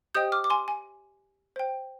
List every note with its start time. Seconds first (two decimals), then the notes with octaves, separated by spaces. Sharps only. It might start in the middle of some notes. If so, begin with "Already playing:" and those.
0.15 G4 C5 D#5 G5 D#6 G6
0.32 D6 F6
0.44 D6
0.50 G#5 C6
0.68 G#5
1.56 C5 G5